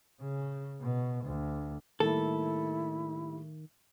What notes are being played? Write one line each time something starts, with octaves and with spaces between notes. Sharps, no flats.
C#3
B2
D2
A2 D#3 G3 A#3 E4 A4